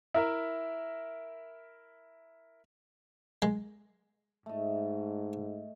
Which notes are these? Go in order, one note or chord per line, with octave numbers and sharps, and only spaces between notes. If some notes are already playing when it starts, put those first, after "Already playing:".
E4 A#4 E5
G#3
G#2 A3 D#5